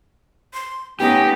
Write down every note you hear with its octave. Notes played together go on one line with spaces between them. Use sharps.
C6
A3 B3 C#4 D#4 G4 B4